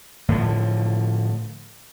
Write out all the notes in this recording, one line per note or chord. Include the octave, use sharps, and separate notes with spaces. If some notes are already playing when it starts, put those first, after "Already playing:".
A2 D3 F3